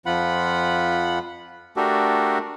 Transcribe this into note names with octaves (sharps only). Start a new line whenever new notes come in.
F2 F3 F4 F#5 B5
A3 D4 F#4 G4 A4 A#4